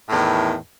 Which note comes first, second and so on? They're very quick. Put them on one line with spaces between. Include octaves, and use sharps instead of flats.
A2 E2 D#3